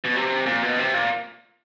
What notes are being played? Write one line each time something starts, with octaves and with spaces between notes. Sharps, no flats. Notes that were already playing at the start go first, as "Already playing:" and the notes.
B2
C3
A#2
B2
C3
A#2